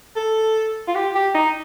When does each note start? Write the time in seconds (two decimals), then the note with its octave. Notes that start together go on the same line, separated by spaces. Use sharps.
0.16 A4
0.88 F4
0.95 G4
1.15 G4
1.34 D#4